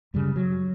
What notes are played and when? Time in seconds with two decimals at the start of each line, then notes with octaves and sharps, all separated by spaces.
0.14 F#2 C#3 G3
0.36 F#3